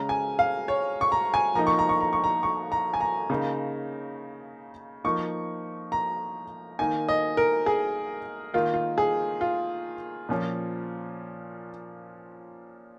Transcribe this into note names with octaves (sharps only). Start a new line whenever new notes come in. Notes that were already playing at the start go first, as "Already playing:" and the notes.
Already playing: C#3 G#3 C#4 A#5
G#5
F5
C#5
C#6
A#5
G#5
F3 A#3 D#4 A#5
C#6
A#5
C#6
A#5
C#6
A#5
C#6
A#5
G#5
A#5
C#3 A#3 D#4
F3 A#3 D#4 C#6
A#5
D#3 A#3 D#4 G#5
D#5
A#4
G#4
D#3 A#3 D#4 F4
F4
G#4
F4
A#2 F3 C#4